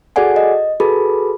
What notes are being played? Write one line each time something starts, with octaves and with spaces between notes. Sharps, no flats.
F#4 G#4 A4 D5 F#5 G#5
D#5
F#4 G#4 A4 B4 B5